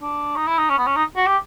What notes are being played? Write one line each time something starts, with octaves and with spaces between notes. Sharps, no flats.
D4
D#4
E4
D#4
C#4
B3
C#4
D#4
F#4
G4